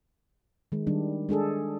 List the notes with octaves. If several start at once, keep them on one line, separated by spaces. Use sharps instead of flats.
D#3 G#3
D#3 G3 D4
G#3 D4 G#4 A4